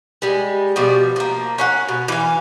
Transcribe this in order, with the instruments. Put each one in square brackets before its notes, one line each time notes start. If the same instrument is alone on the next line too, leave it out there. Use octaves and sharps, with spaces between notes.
[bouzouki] G3 G#3
B2 F3 G3
F3 A#3
C#4 F5 F#5
B2
E3 F5